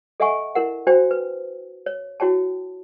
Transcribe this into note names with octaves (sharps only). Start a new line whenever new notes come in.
A4 D#5 E5 F#5 G#5 C#6
E4 A#4 F#5
D4 F#4 C5 G5
B4
C#5
E4 F#4 C#5 G5 A5